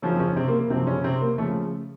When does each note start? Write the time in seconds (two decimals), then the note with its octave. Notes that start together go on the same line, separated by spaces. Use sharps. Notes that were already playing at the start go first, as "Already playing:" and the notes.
0.02 F#2 C#3 F3 C#4
0.16 C4
0.20 C#3 C#4
0.36 C3 C4
0.48 A#3
0.59 A#3
0.70 F#2 C3 F3 C4
0.87 C#3 C#4
1.04 C3 C4
1.21 A#3
1.38 C#3 F3 A3